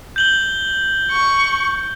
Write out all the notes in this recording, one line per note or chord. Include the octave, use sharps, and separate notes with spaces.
G6 F#7 G7
C#6